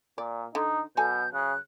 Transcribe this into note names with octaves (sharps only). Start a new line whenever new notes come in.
A#2 D5
D3 D#4
B2 F#3 A4 G#5 G6
C#3 F#6